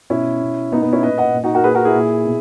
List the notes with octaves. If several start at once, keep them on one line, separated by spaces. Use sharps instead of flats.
B2 C#4 E4
B2
B2 B3 D#4
B3 D#4
C#4 E4
A#2 B4 D#5
D#5 F#5
A#2
D#4 F#4
F#4 A#4
A#2 G#4 B4
F#4 A#4
E4 G#4
A#2
B2